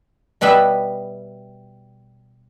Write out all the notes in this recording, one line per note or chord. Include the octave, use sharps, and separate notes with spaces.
B2 G3 B3 B4 E5